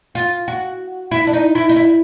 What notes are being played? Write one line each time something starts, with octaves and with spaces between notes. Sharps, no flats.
F4
F#4
E4
D4
D#4
E4
D#4
E4